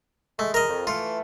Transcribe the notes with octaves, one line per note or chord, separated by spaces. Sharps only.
G#3 A3
A#4 D#5
F2
E3 A3 F4